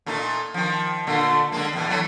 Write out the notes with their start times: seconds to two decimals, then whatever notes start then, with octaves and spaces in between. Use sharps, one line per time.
0.06 A#2 A3 D#4
0.54 D#3 F3
1.07 A#2 D3 A3
1.52 D3 G#3 A#3
1.73 E2 B2
1.89 E3 F#3 A3